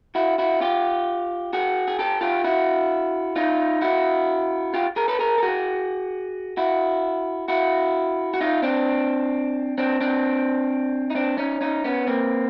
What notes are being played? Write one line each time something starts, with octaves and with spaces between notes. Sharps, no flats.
E4 F#4
E4 F#4
F4 G4
F#4 G#4
G#4
G4 A4
F4 G4
E4 F#4
D#4 F4
E4 F#4
F4 G4
G#4 A#4
A4 B4
G#4 A#4
A4
F#4 G#4
E4 F#4
E4 F#4
F#4
D#4 F4
C4 D4
C4 D4
C4 D4
D#4
C4 D4
C#4 D#4
C#4 D#4
B3 C#4
A#3 C4